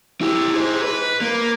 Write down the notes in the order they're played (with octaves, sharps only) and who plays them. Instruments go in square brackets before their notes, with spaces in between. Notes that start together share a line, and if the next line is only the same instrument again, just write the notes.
[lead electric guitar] E4 G4
G#4 C5
B4
A#3